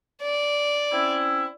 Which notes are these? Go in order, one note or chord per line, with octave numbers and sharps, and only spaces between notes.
D5
C4 C#4 E4